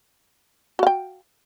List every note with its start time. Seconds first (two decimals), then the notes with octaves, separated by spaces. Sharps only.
0.79 F#4
0.83 F5
0.87 G5